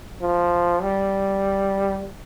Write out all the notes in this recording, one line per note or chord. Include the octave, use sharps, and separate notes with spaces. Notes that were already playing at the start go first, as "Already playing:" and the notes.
F3
G3